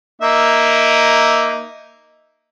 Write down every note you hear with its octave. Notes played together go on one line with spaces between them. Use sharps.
A#3 D#4 E5